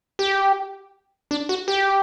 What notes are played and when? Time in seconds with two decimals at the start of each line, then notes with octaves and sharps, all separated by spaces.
0.19 G4
1.31 D4
1.49 F#4
1.68 G4